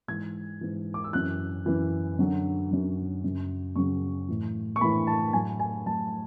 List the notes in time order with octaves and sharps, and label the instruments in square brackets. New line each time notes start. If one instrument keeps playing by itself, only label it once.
[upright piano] G#2 E3 G#6
G#2 E3
D6
E6
F#2 E3 F#6
F#2 E3
F#2 D3 F#3
F#2 D3 F#3
F#2 C#3 F#3
F#2 C#3 F#3 C#6
A2 E3
C#6
A2 E3 B5
A5
A2 F#3 G#5
G#5
A2 F#3 A5